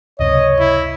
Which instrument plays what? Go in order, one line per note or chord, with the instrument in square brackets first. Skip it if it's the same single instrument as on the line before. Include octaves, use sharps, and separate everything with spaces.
[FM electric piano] C#2 F#2 C3 [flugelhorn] C#5 [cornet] D#5
[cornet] E4